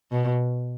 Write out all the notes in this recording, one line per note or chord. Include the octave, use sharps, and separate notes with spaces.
B2